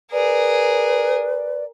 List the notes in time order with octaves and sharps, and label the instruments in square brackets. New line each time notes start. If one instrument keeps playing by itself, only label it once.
[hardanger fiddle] G#4 A#4 [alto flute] B4 [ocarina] D5